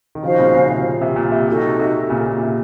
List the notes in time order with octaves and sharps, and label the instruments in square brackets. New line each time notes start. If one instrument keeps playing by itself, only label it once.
[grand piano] D#3
[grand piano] C#3 F3 [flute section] D#4 F#4 C5 F5
[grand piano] A#2 C#3
A#2 C#3
C3
A#2
C3
A#2
C3
[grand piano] C3 [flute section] D#4 F#4 A4
[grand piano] C3
A#2 C#3
A#2
C3